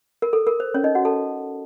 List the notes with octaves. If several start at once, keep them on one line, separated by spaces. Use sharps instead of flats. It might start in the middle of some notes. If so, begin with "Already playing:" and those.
A#4
A4
A#4
C5
C#4 C#5
D#4 D#5
F#4 F#5
A4 A5